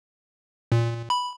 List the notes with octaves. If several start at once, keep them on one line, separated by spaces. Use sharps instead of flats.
A#2
B5